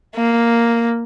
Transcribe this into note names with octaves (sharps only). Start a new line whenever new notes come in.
A#3